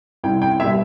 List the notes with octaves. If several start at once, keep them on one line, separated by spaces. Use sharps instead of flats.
C2 G5
G5
B2 G3 E5